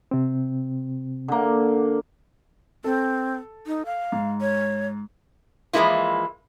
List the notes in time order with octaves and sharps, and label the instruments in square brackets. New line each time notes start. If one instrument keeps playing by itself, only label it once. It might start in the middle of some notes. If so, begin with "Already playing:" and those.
[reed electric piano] C3 C4
[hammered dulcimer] D3 A#3
[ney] C4 [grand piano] A4
[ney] D#4
F5
[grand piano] G#2
[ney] C#5
[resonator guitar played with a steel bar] E3 F3 G#3 A#3 E4 F4